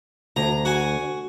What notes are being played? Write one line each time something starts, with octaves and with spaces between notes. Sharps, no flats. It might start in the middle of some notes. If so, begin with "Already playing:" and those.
D2 A#5
F#4 G#5